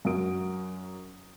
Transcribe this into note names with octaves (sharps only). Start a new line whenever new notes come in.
F#2 F#4 A#4 D#6 D7